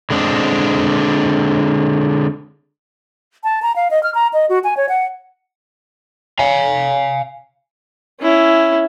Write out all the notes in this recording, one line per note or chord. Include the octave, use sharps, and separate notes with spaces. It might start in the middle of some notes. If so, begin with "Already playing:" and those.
D3 G#3 C4 D4
A5
A#5
F5
D#5
F6
A#5
D#5
F#4
G#5
C#5
F#5
F5 G#5
C#4 E4